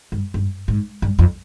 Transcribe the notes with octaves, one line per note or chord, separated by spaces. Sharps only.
G2
G2
G#2
G2
F2